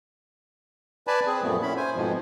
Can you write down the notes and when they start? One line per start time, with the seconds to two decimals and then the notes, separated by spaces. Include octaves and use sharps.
1.07 B4 D5 G#5 A5 B5
1.27 C4 G#4
1.42 F#2 A#2 F3 G3 A3 B3
1.62 A#2 C#4 E4 B5
1.77 C5 G#5
1.95 F2 G#2 B2 F3